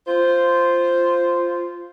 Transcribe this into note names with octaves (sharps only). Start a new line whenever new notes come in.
F4 C5